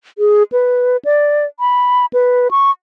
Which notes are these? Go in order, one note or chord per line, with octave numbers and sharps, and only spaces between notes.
G#4
B4
D5
B5
B4
C#6